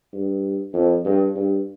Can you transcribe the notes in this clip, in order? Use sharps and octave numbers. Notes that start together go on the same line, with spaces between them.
G2
F2
G2
G2